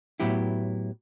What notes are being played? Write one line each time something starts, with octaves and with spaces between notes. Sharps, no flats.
A2 F#3 B3 E4 G4